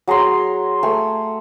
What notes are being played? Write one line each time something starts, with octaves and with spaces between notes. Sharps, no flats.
F#3 G#4 A#5 C6
A3 G5 G#5